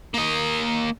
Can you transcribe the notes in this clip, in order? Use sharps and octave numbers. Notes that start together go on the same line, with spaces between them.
A#3 D#5